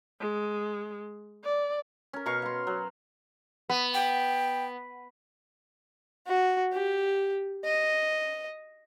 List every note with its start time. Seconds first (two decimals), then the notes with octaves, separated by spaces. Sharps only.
0.21 G#3
1.44 D5
2.13 C#4 A#4
2.26 B2 A#4 F5 C#6
2.42 F5 C6
2.67 F#3
3.70 B3
3.94 G5
6.27 F#4
6.73 G4
7.65 D#5